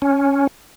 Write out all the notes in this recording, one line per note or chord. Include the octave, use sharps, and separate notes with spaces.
C#4